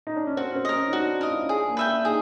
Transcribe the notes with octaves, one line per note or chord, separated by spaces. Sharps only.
D#4
D4
C#4
C4 F#4
C#4
C4
A#4 D#5
C#4
D#4
D4 F#4
D#4
F4 A#4 D#5
E4
C#4
D4 G#4
A#3
B4 E5 G5
D4
D#4 G#4